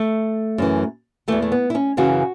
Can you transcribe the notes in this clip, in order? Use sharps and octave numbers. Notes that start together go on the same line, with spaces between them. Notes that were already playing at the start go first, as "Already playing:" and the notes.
Already playing: A3
F#2 E3
E2 E3 A3
A3
B3
E4
C#4
F#2 C#3 E3 F#4